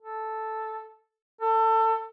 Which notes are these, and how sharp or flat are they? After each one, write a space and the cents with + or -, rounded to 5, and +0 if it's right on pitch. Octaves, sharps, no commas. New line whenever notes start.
A4 -5
A4 +25